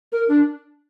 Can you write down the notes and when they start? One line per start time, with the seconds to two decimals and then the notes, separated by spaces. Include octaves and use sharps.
0.12 A#4
0.29 D4